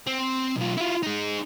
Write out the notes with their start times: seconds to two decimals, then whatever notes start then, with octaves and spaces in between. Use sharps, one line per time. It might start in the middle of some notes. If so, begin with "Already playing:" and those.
0.07 C4
0.57 B1 F4
0.77 E4 F4
1.03 D#4 G#4